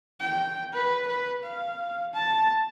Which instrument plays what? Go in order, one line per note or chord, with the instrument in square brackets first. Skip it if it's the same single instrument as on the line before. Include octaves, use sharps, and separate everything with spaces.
[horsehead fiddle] G5
B4
B4
F5
A5